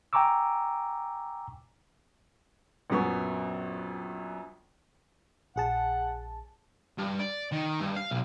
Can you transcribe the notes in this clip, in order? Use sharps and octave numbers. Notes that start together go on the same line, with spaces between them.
G5 G#5 A#5 C#6 D6 E6
A#1 F#2 B3 C#6
A#1 G#4 F#5 A5
G2
D5
D#3
G2
F5
B1